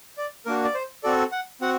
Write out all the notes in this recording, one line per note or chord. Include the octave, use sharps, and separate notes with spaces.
D5
A#3 D4 F#4 A#4
D5
C5
C4 F#4 A4 D5
F#5
C4 F#4 F#5